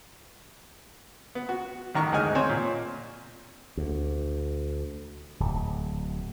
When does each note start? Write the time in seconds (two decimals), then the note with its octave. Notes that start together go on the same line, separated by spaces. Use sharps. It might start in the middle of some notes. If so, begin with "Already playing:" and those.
1.35 B3
1.49 F#4
1.95 A1 D#3 A#5 C#6
2.12 D2 G#2 G#3 D#4 G#5 F6
2.35 C4 C5 C#5 G#5
2.49 A#2
3.77 D2
5.40 D1